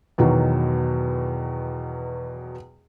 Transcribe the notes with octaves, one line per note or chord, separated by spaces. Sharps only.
E2 B2 D#3 F#3